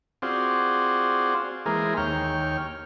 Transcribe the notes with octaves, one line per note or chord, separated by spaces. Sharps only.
C4 F4 F#4 G#4 C5 D5
E3 G#3 A#3 G#4 A#4 C5
D#2 C#5 G5 F6